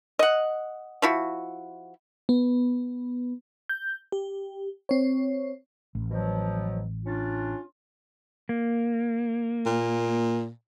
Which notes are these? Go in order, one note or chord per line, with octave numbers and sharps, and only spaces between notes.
D#5 F#5
F3 E4 F#4
B3
G6
G4
C4 C#5
A1
B2 F3 F#3
C#4 D4 F4
A#3
A#2